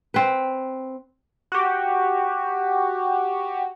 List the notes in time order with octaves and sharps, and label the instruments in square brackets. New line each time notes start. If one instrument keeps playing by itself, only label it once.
[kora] C4 B4
[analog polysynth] F#4 G4